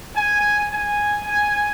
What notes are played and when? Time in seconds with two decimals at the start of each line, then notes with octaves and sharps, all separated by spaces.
0.16 G#5
0.72 G#5
1.27 G#5